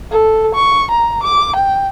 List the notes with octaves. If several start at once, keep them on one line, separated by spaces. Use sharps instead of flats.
A4
C#6
A#5
D6
G5